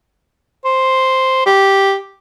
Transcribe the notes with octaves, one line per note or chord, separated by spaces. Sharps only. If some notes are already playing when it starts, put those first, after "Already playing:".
C5
G4